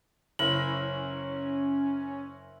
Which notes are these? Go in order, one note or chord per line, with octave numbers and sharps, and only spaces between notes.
F#1 C#4 E4 A#4 F#7